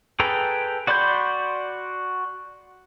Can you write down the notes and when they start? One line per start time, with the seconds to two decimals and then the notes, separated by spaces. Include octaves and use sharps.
0.20 G#4 A4 B4 G5 A#5
0.87 F#4 D5 B5 C6 G6